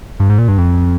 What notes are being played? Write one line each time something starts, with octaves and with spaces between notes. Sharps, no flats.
G2
G#2
A#2
G2
F2